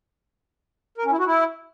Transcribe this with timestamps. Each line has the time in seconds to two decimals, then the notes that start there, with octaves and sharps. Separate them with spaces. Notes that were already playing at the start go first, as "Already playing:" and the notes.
0.98 A#4
1.05 C#4
1.12 E4
1.19 F#4
1.26 E4